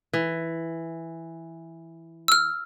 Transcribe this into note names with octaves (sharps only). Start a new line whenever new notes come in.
E3
E6 F6